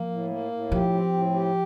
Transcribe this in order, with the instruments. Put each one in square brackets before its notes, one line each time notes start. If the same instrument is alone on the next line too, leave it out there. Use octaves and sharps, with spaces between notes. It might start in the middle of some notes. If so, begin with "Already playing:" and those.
Already playing: [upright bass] F3 [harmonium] A#3
[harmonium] A2
A#3
A2
[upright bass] F3 [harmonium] G4
[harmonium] C4
A2
G4